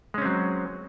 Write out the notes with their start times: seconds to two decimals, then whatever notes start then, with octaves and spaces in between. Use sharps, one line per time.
0.14 G#3
0.18 C#4
0.22 C4
0.25 F#3